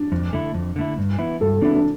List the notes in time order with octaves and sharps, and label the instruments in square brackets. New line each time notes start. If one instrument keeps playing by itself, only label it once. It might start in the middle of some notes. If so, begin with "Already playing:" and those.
Already playing: [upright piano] D4
[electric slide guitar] F2
D3 A3 E4
F2
D3 A3 E4
G2
E3 B3 E4
[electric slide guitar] G2 [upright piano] A4
[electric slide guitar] E3 B3 E4 [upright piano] D4
[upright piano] D4